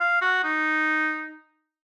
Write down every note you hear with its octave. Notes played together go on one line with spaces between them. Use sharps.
F5
F#4
D#4